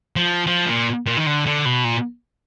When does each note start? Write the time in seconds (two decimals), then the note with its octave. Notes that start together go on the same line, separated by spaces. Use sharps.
0.16 F3
0.47 F3
0.66 A#2
1.06 A#2
1.17 D#3
1.26 D3
1.46 D3
1.65 B2
1.84 A#2